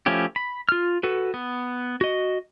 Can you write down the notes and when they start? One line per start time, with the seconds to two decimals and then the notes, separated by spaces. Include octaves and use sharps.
0.06 F3 A3 C#4 E4 G4
0.36 B5
0.69 F4 F6
1.03 F#4 A4 B4
1.34 B3
2.01 F#4 D#5